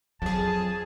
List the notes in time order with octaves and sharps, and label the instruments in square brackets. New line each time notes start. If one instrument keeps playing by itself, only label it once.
[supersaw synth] F2 G#4 [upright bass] F#3 [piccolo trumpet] A5